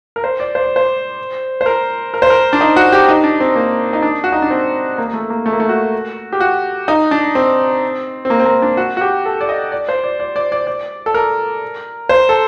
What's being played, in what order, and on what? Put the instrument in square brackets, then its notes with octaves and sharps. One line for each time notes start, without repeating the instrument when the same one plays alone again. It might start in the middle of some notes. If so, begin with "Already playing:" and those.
[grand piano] A#4
C5
D5
C5
D5
C5
C5
A#4
A#4
C5
A#4
D4
D#4
F#4
G4
D#4
D4
C4
A#3
D#4
D4
F#4
D#4
D4
C4
A#3
A#3
A3
A#3
A3
A#3
A3
F#4
G4
F#4
D#4
D4
C4
C4
A#3
C4
A#3
D4
F#4
F#4
G4
A4
D5
D#5
D5
C5
D5
D5
D5
D5
D5
A4
A#4
C5
A4